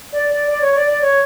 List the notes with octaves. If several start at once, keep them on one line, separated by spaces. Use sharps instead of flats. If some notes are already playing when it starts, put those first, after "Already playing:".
D5
D5
D5
C#5
D5
D5
C#5